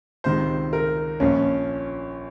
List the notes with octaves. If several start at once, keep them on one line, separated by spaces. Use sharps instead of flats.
C#2 C3 D#3 C5
A#4
A#1 A#2 F3 C#4